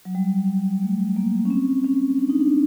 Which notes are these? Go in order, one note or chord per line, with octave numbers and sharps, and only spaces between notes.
F#3
G3
A3
A#3
C#4
C4
C#4
D4
D#4
D4